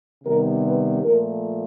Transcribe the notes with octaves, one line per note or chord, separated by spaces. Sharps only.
C3 D#3 G3 B3 A#4
B4
A#2 F3 A3 A#4